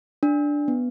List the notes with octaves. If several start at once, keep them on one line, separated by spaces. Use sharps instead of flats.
D4
B3